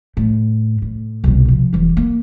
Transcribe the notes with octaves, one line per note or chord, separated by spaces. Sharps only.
A2
A2
C2 B2
F3
E1 E3
A#3